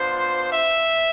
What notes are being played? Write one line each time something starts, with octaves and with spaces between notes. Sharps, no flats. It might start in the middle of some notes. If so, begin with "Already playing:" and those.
Already playing: B3 D4 F4 C5
E5